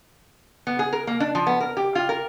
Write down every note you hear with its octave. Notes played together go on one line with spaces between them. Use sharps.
B3
G#4
A#4
A#3
D4
F3
B3
A#4
G4
F4
A#4